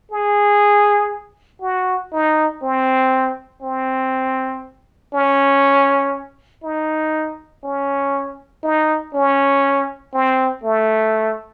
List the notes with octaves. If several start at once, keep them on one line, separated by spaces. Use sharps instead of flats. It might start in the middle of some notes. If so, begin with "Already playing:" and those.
G#4
F#4
D#4
C4
C4
C#4
D#4
C#4
D#4
C#4
C4
A3